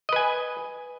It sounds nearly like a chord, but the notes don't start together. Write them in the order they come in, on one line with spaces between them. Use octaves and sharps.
D#5 B4 G#5